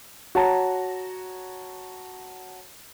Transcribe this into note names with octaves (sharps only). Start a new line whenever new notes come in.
F#4 C#5 A5 A#5